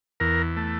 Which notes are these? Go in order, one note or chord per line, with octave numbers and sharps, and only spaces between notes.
E2 A#4
A3